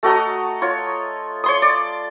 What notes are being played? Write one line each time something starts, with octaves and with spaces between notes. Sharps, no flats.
A3 F#4 D#5 A#5
F4 C#5
C#5 C6 D#6
D5